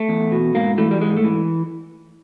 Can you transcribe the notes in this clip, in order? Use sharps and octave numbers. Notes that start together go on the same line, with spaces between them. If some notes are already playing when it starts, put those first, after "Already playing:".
Already playing: A3
E2
B2
G#2 A#3
E3 A3
G3
G#2 G#3
A3
E3